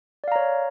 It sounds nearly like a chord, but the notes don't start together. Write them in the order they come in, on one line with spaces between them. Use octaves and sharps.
D5 F5 A#5 C#5